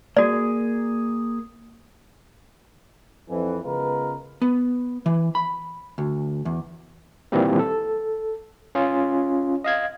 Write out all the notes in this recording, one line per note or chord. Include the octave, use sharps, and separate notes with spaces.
A#3 F#4 G#4 D5
F2 E3
C#3 G#3 B3 F4 A#4 B4
B3
E3
B5
D2
E2
A#2 D#3 E3 G3 A#3 C4
A4
C#4 F4
D#5 F5 G#6